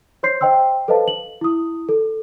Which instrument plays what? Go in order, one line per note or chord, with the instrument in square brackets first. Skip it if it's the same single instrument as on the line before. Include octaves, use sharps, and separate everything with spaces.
[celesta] C5 C#5 C6 G6 C7
C5 D#5 G5 C6 E6
A4 B4 C5 D#5 F5 A5
F#7
E4 D#6
A4